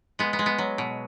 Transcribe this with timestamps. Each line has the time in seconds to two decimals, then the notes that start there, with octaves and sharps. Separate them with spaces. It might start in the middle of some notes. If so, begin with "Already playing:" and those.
0.19 G#3 B3
0.33 B3
0.39 G#3
0.46 B3
0.58 F#3
0.78 B2